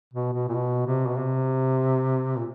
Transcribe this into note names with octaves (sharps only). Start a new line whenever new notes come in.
B2
B2
A#2
B2
C3
B2
C3
A#2